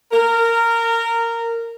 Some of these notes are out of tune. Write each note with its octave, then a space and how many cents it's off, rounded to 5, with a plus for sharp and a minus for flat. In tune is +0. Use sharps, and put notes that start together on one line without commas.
A#4 -15